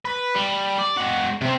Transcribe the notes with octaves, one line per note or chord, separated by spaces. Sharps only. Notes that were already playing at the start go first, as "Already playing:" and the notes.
B4
G3
D5
G#3 F#4
C3 C4